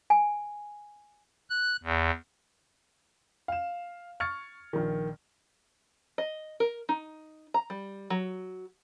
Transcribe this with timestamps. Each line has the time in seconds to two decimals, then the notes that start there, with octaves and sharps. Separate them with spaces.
0.10 G#5
1.50 F#6
1.83 E2
3.48 F5 E7
4.20 C#6 F6 G#6 A6 C#7
4.73 A#1 D#3
6.18 D#5
6.60 A#4
6.89 D#4
7.54 A#5
7.70 G3
8.10 F#3